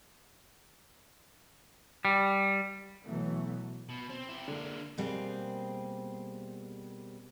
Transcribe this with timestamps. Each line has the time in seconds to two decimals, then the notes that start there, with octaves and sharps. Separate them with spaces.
2.05 G3
3.05 B2 E3 F#3 A3 B3
3.89 B2
4.10 C4
4.29 E4 G4
4.48 D3 G#3 A#3
4.98 B2 G3 A#3 C4 G4 G#4